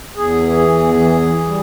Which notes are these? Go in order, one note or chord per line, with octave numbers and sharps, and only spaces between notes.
E2 G#4
E3
E2
E3
E3
G3